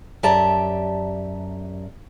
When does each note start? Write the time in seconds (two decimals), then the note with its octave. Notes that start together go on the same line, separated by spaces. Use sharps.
0.23 F#2 G4 D5 E5 A5 A#5